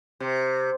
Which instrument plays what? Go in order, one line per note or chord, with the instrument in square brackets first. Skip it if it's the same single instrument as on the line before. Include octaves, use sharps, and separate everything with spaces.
[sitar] C3